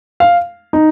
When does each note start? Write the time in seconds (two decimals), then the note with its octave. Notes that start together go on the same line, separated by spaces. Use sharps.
0.20 F5
0.73 D#4